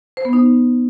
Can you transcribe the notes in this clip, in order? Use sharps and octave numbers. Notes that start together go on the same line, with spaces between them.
C5
B3
D#4